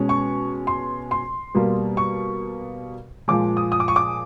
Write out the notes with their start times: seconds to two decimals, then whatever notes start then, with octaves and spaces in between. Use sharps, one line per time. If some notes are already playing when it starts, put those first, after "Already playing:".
Already playing: B2 G#3 C#4
0.09 C#6
0.67 C6
1.11 C6
1.54 B2 G3 A#3
1.97 C#6
3.28 A#2 F3 G#3 D6
3.57 D#6
3.72 D#6
3.80 D6
3.88 C#6
3.96 D6